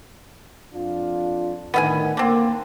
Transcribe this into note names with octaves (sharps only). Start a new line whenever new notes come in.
F2 D4 F4
A2 D3 D#3 B3 E5 G#5
D3 A#3 C4